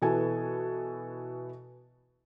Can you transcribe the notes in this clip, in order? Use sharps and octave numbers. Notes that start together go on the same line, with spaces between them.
B2 E3 B3 A4 G#5